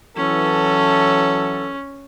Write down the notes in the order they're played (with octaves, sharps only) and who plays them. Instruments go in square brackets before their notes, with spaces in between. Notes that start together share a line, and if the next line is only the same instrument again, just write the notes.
[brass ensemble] E3 F#3 A4 [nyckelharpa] C#4